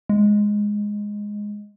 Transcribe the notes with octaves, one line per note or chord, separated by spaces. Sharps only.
G#3